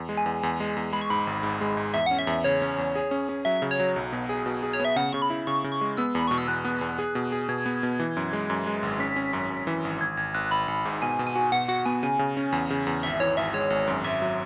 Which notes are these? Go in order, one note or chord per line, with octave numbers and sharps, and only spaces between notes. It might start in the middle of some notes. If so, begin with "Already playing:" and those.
Already playing: E2
G#3
G#5
E2
E2
G#3
E2
G#3 B5
C#6
G#2 B5
G#1
G#2
G#3
G#2
E2 E5
C#4 F#5
E5
E2
C#3 C#5
C#4
E2
G#4
C#4
C#4
F#3 E5
C#3
C#5
F#3
B1
B2
G#4
B2
G#4
C#5
B3
E5
C#3 F#5
C#3 C#6
B5
E4
C#3 C#6
C#3
C#6
G#3
B3 E6
E2 B5
B2 C#6
E6
E2 F#6
B3
E2
G#4
B2
G#4
B2 G#6
B3
B2
E3
F#2
G#3
F#2
G#3
G#1
C#4 B6
C#4
F#2
F#2
E3
G#1
G#1 G#6
G#1 G#6
G#1 F#6
G#1 B5
G#1
G#2
B2 G#5
B2
G#5
F#4
B2 F#5
F#4 F#5
B3 G#5
C#3 G#5
C#3
C#4
E2
C#3
E2
G#1 E5
E3 C#5
G#1 E5
G#3 C#5
G#1
F#2
G#1 E5
F#3